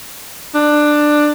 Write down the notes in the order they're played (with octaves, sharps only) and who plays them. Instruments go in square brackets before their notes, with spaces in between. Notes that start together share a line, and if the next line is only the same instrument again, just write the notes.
[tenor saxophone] D4